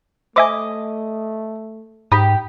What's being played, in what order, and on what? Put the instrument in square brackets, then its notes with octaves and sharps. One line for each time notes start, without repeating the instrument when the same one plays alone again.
[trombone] A3 [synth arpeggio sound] C5 E5 G#5 [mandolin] D#5 D6
[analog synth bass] G#2 [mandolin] G4 [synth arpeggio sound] A#5 B5 D#6